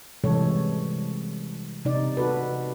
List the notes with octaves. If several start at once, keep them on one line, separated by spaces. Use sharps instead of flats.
C3 E3 G3 G#3 A4 C#5
C3 D#4 D5
F#4 A4 B4